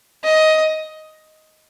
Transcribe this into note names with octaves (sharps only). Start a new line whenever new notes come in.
D#5